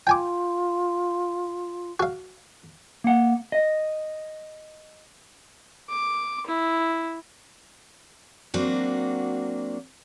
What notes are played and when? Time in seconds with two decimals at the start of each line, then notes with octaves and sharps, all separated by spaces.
0.07 F4 G5 G#5 D6
2.00 F#4 F5
3.04 A#3 F#5
3.52 D#5
5.90 D6
6.47 E4
8.54 F#3 A#3 C4 D4 F#4